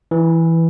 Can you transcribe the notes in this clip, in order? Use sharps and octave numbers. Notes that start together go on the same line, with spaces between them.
E3